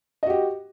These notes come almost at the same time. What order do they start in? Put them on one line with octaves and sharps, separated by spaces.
D#5 F#4 G4